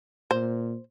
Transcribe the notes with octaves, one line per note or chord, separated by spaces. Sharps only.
A#2 C5